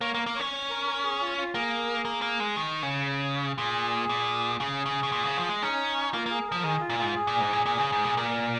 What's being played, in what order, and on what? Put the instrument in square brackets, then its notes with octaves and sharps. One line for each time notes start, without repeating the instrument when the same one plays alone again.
[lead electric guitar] A#3 [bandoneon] C#5
[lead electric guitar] A#3
[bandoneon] A#4
[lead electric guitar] A#3
[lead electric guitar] C#4 [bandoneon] C#5
[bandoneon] C#5
A#4
A#4
G#4
F4
F4
[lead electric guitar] A#3 [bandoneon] G#4
[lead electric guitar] A#3
A#3
G#3
D#3
C#3
[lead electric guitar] A#2 [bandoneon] G#4
[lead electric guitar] A#2
[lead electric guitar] C#3 [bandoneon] G#4
[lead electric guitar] C#3
C#3
A#2
C#3
F3
G#3
[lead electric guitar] C#4 [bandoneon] D#4
[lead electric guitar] A#3 [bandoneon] F4
[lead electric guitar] A#3 [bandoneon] G#4
[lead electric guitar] F3 [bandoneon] A#4
[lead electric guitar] D#3 [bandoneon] G#4
[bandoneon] F4
[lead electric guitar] A#2
[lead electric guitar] G#2 [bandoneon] F4
[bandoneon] G#4
[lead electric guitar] A#2
G#2
A#2
A#2
C#3
G#2
A#2
[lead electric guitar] A#2 [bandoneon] A#4